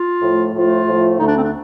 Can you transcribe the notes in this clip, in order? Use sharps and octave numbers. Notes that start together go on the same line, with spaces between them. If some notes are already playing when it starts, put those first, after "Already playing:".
Already playing: F4
A2 F3 A3
A2 F3 A3 F4
A2 F3 A3
D2 D3 A3 D#4
D4
C4
D4